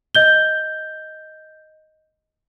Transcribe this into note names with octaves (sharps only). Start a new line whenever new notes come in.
D#5 G6 G7